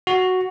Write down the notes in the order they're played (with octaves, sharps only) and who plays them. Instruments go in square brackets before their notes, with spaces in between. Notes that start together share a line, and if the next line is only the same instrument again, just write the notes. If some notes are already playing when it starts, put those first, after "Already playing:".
[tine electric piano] F#4